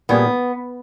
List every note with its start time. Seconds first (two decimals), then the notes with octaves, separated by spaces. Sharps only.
0.09 A#2 G3 A#3 B3 C#4 G#4